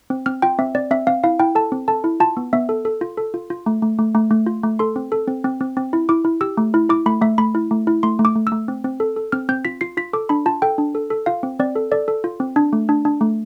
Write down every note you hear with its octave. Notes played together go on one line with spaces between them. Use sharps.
C4
C4 F6
F4 G5
C4 E5
C4 D5
C4 E5
C4 F5
E4 F5
E4 G5
A4 A5
C4
A4 A5
E4
F4 A5
B3
B3 E5
A4
A4
F4
A4
F4
F4
A3
A3
A3
A3
A3
F4
A3
A4 C6
C4
A4
C4
C4
C4
C4
E4
E4 D6
E4
G4 E6
A3
E4
E4 D6
A3 B5
A3 E5
A3 B5
E4
A3
E4
A3 C6
A3
D6
A3
E6
A3
C4
C4
A4
A4
C4 F6
C4 G6
F4 B6
F4 C7
F4 B6
A4 D6
D4 B5
F4 A5
A4 G5
D4
A4
A4
F4 F5
C4
C4 D5
A4
A4 D5
A4
F4
C4
D4
A3
D4
D4
A3